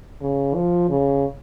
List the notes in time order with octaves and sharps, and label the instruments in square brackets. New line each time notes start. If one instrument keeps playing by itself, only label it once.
[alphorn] C#3
F3
C#3